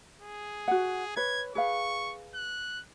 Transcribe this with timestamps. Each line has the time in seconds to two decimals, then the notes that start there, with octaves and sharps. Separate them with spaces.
0.21 G#4
0.68 F#4 F#5
1.16 B4 C#5 G#6
1.55 G#4 B4 F5 C#6
2.35 F#6